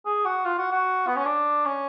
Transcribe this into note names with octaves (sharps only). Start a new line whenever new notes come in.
G#4
F#4
F4
F#4
F#4
B3
C#4
D4
C#4